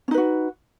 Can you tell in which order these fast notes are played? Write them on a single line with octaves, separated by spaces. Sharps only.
C#4 D#4 B4 F#4